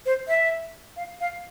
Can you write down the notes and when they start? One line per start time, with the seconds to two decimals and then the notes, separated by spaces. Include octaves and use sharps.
0.06 C5
0.28 E5
0.96 F5
1.20 F5